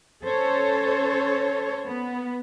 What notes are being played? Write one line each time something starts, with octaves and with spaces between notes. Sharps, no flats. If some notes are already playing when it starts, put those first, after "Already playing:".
C#4 A4 C5 C#5
B3